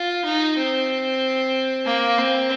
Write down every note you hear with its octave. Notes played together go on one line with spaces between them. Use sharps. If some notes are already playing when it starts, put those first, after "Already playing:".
Already playing: F4
D#4
C4
A#3
C4